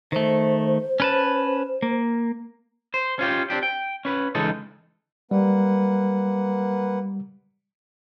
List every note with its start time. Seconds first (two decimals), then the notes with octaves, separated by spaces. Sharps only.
0.12 D#3 A3 C5
1.00 C#4 B4 A5
1.82 A#3
2.94 C5
3.19 C#4 F4 G4
3.50 C4 D4 G4
3.63 G5
4.05 C#4 B4
4.35 C#2 E3 G#3 D#4 A4
5.31 G3 A#3 B4 F#5